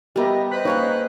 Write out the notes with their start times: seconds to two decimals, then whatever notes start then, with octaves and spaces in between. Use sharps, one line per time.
0.16 G3 B3 G4 A#4 D#5 E5
0.51 B4 C5 D#5 B5 F#6
0.65 A#3 C#4 D#4 G#4 C#5